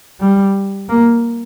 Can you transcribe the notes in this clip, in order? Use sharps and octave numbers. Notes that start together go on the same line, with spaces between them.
G3
A#3